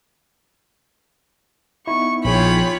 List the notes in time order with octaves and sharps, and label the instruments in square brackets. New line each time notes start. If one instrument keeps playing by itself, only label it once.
[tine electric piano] B3 D#4 E4 [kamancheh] C#6
[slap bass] A#1 F3 [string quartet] F4 C#5 B5 [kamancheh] G#4 G5